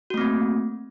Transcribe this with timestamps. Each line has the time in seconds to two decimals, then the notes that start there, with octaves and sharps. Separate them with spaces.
0.10 F#4
0.14 A3
0.18 C4
0.21 A#3